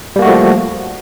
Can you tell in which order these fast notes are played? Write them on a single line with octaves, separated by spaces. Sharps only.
G3 A#3 F#4 A3 F3